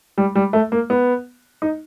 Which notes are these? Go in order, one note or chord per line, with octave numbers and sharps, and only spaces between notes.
G3
G3
A3
A#3
B3
D#4